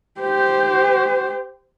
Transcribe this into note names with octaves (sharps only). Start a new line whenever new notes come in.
G4 C5